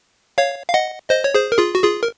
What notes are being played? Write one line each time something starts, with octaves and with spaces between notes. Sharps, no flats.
C#5 F5
F5
D#5 F#5
C5 D#5
C#5
G#4 C5
A#4
F4 G#4
F#4
F4 G#4
A#4